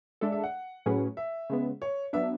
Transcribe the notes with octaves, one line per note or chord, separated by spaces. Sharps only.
G#3 D4 A4 E5
E5
F#5
A2 F#3 C#4 G#4 B4
E5
C#3 G#3 B3
C#5
F#3 B3 D4 E5